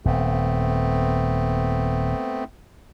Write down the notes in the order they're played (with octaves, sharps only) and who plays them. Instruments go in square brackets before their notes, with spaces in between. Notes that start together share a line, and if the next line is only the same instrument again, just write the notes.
[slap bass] D#1 [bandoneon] A3 B3 C4